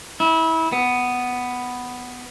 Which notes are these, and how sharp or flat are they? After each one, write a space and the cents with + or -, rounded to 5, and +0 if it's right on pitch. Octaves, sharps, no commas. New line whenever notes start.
E4 -25
B3 +5